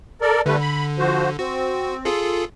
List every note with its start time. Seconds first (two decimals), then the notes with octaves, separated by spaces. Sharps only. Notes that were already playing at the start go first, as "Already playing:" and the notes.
0.21 A4 A#4 D5
0.46 D3 G3 A3 B4
0.61 B5
0.99 F3 F#4 C5
1.39 C4 F#4
2.05 F4 G#4 A4